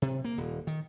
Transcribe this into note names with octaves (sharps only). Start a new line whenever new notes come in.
C3
A#3
D#1
D#3